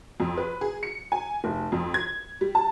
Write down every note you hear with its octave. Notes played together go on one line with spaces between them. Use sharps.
F2
B4
G#4
C#7
G#5
F1
F2
G#6
G3
A5